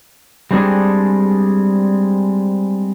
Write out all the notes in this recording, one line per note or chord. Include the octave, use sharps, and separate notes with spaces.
G3 G#3 C4 D4 G#4 A4